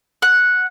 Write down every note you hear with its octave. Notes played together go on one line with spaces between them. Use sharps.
F#5